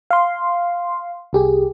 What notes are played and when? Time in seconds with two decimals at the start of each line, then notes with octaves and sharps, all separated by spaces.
0.11 F5 C6
1.33 C2 G4 G#4